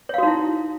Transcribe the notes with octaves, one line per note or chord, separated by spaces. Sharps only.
D#4 E4 F#4 C#5 F5